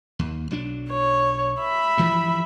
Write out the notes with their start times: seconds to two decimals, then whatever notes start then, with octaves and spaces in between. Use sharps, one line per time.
0.19 D#2
0.51 B1 F#3 D4
0.90 C#5
1.61 E5 B5
1.97 G2 E3 F3